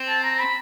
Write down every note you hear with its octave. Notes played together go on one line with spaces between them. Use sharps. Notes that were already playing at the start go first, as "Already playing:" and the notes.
Already playing: C4
A5
A#5
B5